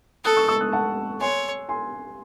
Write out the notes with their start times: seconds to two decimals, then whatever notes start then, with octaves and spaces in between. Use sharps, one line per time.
0.24 A4 D#6 F#6
0.37 C#6 E6
0.48 C#6 E6
0.60 D#6 F#6
0.72 F#5 A5
1.21 C#5 G#5 C6
1.69 G#5 C6